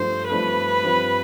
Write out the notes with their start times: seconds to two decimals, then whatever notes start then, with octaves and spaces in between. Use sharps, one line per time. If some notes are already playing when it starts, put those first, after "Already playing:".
Already playing: G2 F3 A3 D4 A4 C5
0.29 G2 F3 A3 D4 A4 B4
0.83 G2 F3 C4